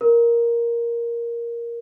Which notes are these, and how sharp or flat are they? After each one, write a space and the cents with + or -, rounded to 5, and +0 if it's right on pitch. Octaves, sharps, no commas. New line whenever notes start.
A#4 +5